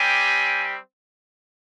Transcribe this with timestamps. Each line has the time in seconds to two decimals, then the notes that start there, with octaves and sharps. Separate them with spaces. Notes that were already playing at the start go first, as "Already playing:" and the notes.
Already playing: G3 C4 G4 G#5